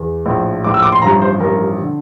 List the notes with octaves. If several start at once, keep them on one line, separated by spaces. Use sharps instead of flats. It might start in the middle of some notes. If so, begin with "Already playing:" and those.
Already playing: E2
A#1 A2 F3
A#1 A2 F3 D6
E6
D6
C6
A1 G2 F3 A#5
C5
A1 G2 F3 A#4
D3